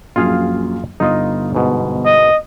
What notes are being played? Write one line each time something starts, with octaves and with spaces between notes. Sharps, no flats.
A#1 F#2 F4 G#4 F5
G1 D#4 F4 D#5
G#2 B2
D#5